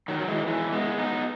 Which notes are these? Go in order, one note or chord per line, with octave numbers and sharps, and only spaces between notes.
D#3 F#3
F#3
E3 G#3
E3 G#3
G#3 B3
B3 D#4